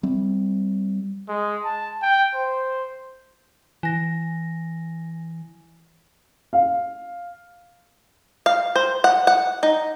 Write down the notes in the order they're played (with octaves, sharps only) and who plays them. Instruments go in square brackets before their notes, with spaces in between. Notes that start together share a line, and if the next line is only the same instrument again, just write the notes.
[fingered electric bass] G3 C4
[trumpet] G#3
A5
G5
C5
[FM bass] E3 [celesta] G#5 A#6
[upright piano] F5
[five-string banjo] F5
C5
F#5
F#5
D#4